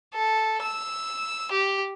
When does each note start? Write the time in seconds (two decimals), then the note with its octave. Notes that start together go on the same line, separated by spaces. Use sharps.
0.14 A4
0.62 E6
1.52 G4